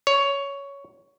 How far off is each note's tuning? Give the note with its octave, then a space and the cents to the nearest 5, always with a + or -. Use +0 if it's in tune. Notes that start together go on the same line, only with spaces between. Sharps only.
C#5 +10